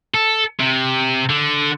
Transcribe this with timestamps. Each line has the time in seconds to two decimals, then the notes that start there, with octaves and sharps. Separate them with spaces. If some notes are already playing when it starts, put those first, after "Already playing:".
0.14 A4
0.60 C3
1.30 D3